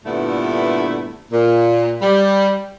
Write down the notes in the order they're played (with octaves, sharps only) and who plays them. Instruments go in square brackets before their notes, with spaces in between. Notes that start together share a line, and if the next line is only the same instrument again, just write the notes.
[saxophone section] G2 A#2 D3 A3 B3 E4
A#2
G3